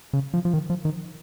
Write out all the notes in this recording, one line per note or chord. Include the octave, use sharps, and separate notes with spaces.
C#3
F3
F3
D#3
F3
D#3